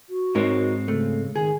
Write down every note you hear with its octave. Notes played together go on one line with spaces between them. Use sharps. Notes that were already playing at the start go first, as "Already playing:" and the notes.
F#4
G#2 G#3 C4 D#4 A#4 C#5
C#3 A3
D#3 G#4